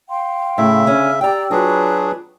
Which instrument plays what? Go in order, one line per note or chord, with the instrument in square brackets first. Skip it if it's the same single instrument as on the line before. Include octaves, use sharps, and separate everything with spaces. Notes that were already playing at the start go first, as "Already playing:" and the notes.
[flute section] F5 G5 C6
[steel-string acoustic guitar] A2 [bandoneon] C#3 E5
[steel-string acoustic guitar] D3 C#4 [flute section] F6
[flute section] G4 D5 E6 [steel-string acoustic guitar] G5 A#5
[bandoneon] F#3 D4 G#4 [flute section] F4 B4 [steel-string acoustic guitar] F#4